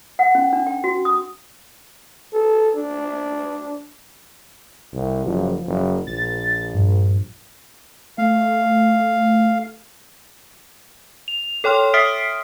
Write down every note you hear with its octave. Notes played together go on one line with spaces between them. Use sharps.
F#5
C#4
D4
G5
F#4
D#6
A4
D4
C2
F#1 F3
F#1
A#1 A6
G2
A3 F5
F7
A4 C#5 G5 C6 F6
E5 D#6 F6 B6 C7 D7